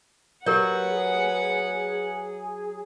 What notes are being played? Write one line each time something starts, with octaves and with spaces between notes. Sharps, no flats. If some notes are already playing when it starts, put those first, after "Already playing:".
F#3 G4 A#4 B4 C#5 F#5
G#4